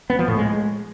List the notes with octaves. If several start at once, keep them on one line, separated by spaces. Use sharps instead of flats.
B3
F3
A2
G#3